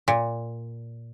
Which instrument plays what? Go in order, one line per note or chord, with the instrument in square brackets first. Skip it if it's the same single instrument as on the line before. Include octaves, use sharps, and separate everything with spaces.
[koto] A#2